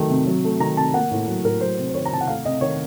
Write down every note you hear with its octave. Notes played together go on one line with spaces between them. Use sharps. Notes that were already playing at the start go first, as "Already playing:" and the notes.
Already playing: D#3 F#3 A3
C3
F#3
A3
D#3 A#5
C3 A5
A#3 F#5
A2
F#3
A2 A#4
F#3 C5
C3
C5
D#3 C#5
A#5
C3 A5
F#5
A3 F5
C3 D#5
D#3 C#5